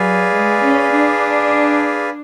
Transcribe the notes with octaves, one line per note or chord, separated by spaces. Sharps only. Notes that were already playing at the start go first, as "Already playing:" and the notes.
Already playing: F#3 G#4 B4 D5 F5 G#5
G#3
C#4
D4